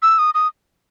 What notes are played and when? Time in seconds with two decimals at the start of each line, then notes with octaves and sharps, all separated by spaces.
0.02 E6
0.19 D#6
0.35 D#6